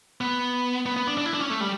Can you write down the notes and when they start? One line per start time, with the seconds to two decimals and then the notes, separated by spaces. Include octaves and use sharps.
0.21 B3
0.86 B3
0.96 B3
1.07 D4
1.18 D4
1.25 E4
1.34 D4
1.41 C#4
1.50 A3
1.60 G3